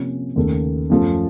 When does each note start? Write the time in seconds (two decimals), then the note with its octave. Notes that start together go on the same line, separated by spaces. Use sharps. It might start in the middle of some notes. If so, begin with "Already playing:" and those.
Already playing: C3 F3 A#3 C#4 F4
0.36 D#2 C#3 A3
0.90 F#2 F3 A3